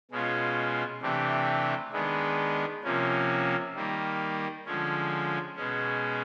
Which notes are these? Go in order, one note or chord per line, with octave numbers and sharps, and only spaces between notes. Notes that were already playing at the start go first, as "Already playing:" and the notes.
B2 G#3 C#4 F4
C3 E3 A3 D4 G4
D#3 G#3 B3 D4
C3 F3 A#3 C#4
D#3 G3 A#3
D3 F3 G#3 C#4
B2 G#3 C#4